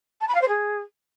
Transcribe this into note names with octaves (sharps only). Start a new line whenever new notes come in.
A5
B5
F5
C5
G#4